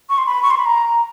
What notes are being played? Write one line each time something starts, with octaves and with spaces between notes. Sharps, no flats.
C#6
C6
B5
C#6
C6
B5
A#5